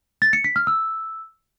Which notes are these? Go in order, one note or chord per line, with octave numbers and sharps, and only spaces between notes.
A6
C#7
B6
F6
E6